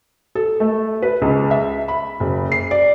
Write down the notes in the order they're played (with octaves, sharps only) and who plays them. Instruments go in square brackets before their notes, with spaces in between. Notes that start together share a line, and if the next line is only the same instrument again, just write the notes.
[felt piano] A4
A3
B4
C#2
E5
B5
F#1
C7
D5